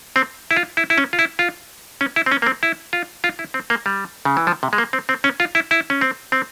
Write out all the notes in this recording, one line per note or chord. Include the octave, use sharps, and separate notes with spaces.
C4
E4
F4
E4
E4
C#4
F4
E4
F4
C#4
E4
C4
C#4
A#3
C4
E4
F4
F4
E4
C4
A#3
G3
C#3
E3
F3
C3
G#3
A#3
C4
C4
C#4
F4
E4
E4
C#4
C4
C4